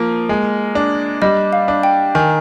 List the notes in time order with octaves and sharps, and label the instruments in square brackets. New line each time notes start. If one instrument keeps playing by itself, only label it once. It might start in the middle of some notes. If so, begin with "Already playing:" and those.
Already playing: [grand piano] F3 A#3
G#3
D4
[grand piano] G3 [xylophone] D#5
[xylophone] F5
[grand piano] D4
[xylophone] G5
[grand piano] D#3 [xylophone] G#5